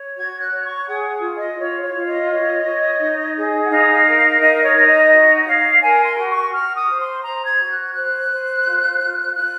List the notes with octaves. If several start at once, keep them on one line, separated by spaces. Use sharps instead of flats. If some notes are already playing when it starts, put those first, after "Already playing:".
Already playing: C#5
F#4 G#6
F#6
C#5
C#6
G#4 F#5
F4
D#5
F4 C#5
C#5
F4
D#5
C#5
C#5
D#4
G#4
F#5
D#4 F5
F5
A#4
F5
D#4 D#5
C#5
D#4
D#5
F#4
C#5 F5
A#4 G#5
C6
F#4
C#6
F#4 F6
D#6
C5
C6
C5 A#5
G#6
F#4
F#6
C5 F#6
C5
F4
F4
F4 F#6